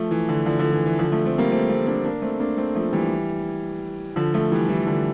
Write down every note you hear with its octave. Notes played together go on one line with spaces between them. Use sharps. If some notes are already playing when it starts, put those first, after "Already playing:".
Already playing: F3 A3
E3
D3
D3 F3
D3 F3
E3
E3
D3 F3
F3 A3
A3 C4
G3 A#3
A3 C4
A3 C4
A#3 D4
A#3 D4
A3 C4
A#3 D4
A3 C4
F3 A3
E3 G3
D3 F3
F3 A3
E3 G3
E3 G3
D3 F3